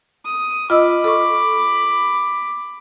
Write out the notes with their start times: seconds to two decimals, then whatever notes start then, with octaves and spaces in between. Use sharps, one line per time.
0.25 D#6
0.70 F4 D#5 B5 D6 E6
1.04 A4 C#6